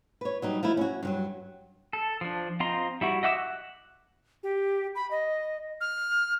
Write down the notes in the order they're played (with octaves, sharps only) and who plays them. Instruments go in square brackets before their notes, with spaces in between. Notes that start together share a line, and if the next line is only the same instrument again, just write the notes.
[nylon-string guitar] B4 C#5
F#3 G3 D#4
F3 A3 D#4 E4
C#4 F#4
G2 F3 F#3
[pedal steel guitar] A4
F3 D4
C4 F4 D#5 A#5 C6
G3 E4 F#4
D#5 E5 F#5 D6 E6
F#6
[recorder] G4
B5
D#5
F6